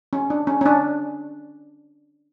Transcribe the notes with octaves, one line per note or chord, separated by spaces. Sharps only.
C#4
D4
C#4
C#4
D4